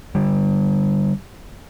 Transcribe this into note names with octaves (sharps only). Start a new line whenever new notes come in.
D3 G3